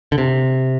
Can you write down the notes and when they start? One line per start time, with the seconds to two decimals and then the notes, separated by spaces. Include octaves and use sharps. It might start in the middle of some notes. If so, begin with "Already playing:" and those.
0.12 D3
0.18 C3